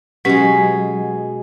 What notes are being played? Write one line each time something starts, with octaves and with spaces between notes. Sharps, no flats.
B2 F#3 G#3 C#4 G4 B4